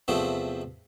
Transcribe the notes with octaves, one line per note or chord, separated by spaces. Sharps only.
E2 C3 F3 A3 C4